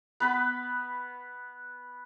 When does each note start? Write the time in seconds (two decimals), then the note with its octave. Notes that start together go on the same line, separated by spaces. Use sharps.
0.20 B3 B4 B5